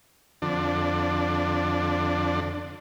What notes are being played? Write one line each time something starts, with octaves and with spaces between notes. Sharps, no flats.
F2 D3 D4